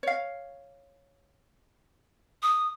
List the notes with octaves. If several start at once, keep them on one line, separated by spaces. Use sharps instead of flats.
C#5 F5
D#6